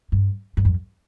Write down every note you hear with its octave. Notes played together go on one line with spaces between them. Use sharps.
G2
G2
F2